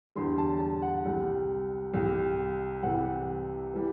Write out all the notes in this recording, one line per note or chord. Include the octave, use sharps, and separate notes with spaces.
E2 D3 G3 C6
A5
A5
F#5
C2 C3 G3
C2 C3 G3
C2 C3 E3 G3 F#5
E3 G3